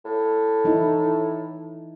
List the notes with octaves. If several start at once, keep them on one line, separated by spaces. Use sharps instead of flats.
A2
E3 D#4 E4